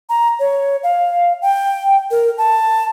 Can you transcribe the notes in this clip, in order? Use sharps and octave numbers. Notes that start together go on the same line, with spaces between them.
A#5
C#5
F5
G5
A#4
A5